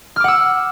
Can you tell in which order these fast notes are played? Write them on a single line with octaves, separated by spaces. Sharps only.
F6 D6 F#5 E6